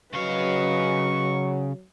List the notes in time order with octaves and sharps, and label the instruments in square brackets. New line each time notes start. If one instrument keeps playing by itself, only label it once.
[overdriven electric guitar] C#3 F5 [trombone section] F#3 [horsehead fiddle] B4 D#5 [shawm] C#6